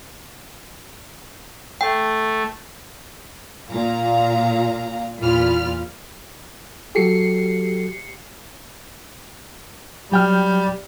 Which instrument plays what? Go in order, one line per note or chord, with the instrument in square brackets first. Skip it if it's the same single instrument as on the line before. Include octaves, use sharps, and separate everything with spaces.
[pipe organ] A3 [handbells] G5
[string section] A#2 F5 A#5
E2 A#2 F4 B5 F6
[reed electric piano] F#3 F#4 A4 [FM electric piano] G4 C7 C#7
[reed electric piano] F#3 G5 F6 [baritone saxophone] G3